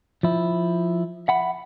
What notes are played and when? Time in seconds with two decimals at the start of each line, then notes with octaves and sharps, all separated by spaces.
0.23 F3 E4
1.28 E5 F#5 B5